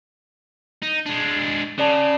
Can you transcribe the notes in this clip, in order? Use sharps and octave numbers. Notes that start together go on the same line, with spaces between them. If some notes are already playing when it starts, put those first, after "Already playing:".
D#4
G#3 D4
C#3 C#4 D5 A5